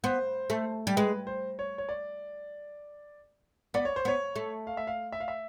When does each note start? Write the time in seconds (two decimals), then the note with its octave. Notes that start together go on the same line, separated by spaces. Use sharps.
0.04 B3 C5
0.50 A3
0.87 G3
0.96 G#3 B4
1.27 C5
1.59 C#5
1.78 C#5
1.89 D5
3.74 B3 D5
3.85 C#5
3.96 C5
4.05 B3 C#5
4.36 A3
4.67 F5
4.77 E5
4.87 F5
5.12 E5
5.20 F5
5.28 E5